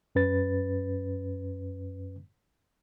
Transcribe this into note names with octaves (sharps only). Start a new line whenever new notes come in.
F#2 C#4 B4 A6